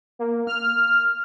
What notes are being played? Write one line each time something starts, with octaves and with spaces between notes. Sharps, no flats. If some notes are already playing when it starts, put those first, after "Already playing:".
A#3
F6